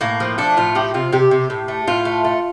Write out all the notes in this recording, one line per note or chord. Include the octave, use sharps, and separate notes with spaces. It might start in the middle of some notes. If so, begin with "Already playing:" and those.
A2 A#3
F3
A3 D4
A2 F4
F3 G4
C3 F4
C3 G4
C3
A2
A3
A2 F4
A3
A3